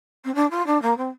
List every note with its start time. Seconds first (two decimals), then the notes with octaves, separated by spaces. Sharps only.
0.24 C4
0.35 D4
0.50 F4
0.66 D4
0.82 A#3
0.97 C4